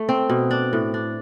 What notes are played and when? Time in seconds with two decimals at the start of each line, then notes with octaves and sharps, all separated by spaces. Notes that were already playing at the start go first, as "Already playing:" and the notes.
Already playing: A3
0.09 C4
0.30 B2
0.51 D4
0.73 A2
0.94 D4